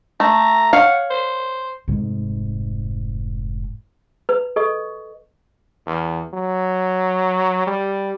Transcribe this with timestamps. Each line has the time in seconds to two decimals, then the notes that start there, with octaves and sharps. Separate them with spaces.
0.20 A3 A#5
0.73 C#5 F5 F#5
1.10 C5
1.88 F1 G#2
4.29 B4
4.56 A4 D#5 C#6
5.86 E2
6.33 F#3
7.67 G3